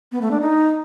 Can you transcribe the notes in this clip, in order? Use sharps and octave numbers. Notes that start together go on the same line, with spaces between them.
B3
A3
D4
D#4